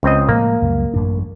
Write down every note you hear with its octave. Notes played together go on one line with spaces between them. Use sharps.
C#2 C4 D#5
A2 F3 G#3 A#3
C#2 F#2 G3
A1 F#2 D4